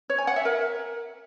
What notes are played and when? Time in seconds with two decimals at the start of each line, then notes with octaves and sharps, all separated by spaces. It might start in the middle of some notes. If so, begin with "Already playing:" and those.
0.10 C#5
0.18 G#5
0.27 F#5
0.36 E5
0.45 A#4